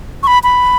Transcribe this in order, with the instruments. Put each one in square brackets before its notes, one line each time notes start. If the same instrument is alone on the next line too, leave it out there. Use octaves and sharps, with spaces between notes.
[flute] C#6
B5
B5